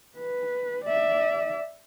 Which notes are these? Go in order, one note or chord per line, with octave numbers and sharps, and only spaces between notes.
B4
D5 E5